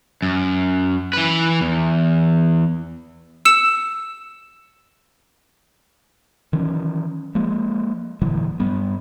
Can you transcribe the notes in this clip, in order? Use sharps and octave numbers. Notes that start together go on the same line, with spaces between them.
F#2
E3 B4
E2
E6 C#7 E7
D#3 E3 F#3 C#4
F3 G#3 A#3
A#2 D3 E3 F#3
G2 G3 B3